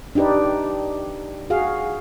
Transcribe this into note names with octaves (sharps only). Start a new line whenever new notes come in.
D4 D#4 G4 B4 D5
F#4 G#4 F5